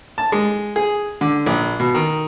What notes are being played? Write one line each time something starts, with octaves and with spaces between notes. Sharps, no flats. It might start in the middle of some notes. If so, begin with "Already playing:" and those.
A5
G#3
G#4
D3
A#1
B2
D#3